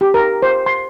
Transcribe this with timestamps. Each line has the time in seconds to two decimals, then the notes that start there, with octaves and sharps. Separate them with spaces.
0.01 G4
0.14 A#4
0.42 C5
0.66 C6